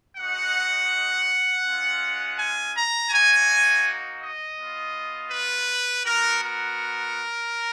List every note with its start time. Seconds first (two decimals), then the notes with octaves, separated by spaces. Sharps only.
0.17 G#3 D#4 F#4 F#5
1.64 G#3 C#4 F4
2.37 G#5
2.74 A#5
3.10 A#3 D#4 F#4 G#5
4.21 D#5
4.57 B3 F4
5.31 B4
6.05 B3 F#4 A#4
6.41 A#4